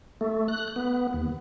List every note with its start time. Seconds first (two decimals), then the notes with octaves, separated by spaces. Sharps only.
0.21 A3
0.48 F#6
0.76 B3
1.13 D#2